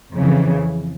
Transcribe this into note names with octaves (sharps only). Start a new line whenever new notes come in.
F2 C#3 E3